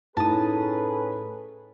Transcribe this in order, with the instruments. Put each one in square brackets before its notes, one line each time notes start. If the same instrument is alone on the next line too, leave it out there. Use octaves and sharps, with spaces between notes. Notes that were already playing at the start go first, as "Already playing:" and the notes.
[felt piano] A2 D#4 [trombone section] C#4 G#4 B4 [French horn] A4 [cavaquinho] A5 D#6